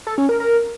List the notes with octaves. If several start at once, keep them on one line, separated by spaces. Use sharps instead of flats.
A4
C#4
A#4
A#4